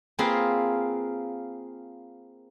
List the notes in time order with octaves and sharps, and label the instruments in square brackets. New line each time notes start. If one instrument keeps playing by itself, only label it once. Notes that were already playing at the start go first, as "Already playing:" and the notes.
[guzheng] A#3 C4 F4 G#4 A#4 B4